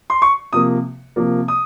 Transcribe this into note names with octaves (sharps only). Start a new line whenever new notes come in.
C6
C#6
C3 F3 A#3 D#6
C3 F3 A#3
D#6